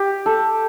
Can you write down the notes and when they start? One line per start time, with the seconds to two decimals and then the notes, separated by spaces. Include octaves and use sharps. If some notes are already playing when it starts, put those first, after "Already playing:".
Already playing: G4
0.26 A4